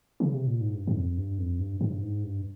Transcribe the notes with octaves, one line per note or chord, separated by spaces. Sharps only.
C#3
C3
A#2
G#2
G2
G2
F2
G2
F2
G2
G2
G#2
G2